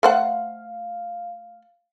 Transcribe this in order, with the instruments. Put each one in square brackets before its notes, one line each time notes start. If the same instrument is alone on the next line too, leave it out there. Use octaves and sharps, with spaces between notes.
[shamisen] A3 C5 F#5 [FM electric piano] F5